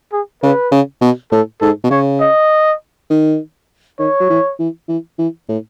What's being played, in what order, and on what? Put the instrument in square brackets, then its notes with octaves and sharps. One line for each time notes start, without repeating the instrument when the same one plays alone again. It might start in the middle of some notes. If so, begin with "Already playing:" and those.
[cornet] G#4
[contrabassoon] C#3 [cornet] B4
[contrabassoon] C#3
B2
[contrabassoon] A2 [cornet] A4
[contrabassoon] G#2 [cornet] A4
[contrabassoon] B2
[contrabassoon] C#3 [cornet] C#5
[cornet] D#5
[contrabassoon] D#3
[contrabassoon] D#3 [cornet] C#5
[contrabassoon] F#3
E3
E3
E3
E3
A2